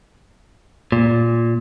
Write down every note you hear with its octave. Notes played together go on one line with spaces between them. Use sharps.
A#2